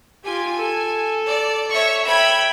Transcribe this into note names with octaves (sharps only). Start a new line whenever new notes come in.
F4 G4 G#5
A4
D5
C#5 E5 C#6
E5 G5 B5 G#6